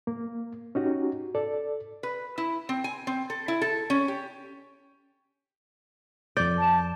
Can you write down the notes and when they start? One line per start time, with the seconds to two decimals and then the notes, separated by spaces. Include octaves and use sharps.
0.07 A#3
0.75 C#4 D#4 F#4 G4
1.35 A4 D5
2.03 B4
2.38 E4
2.69 C4
2.84 G#5
3.07 C4
3.30 A4
3.48 E4
3.62 A4
3.90 C#4
4.08 G4
6.37 F2 D5 G6
6.57 A5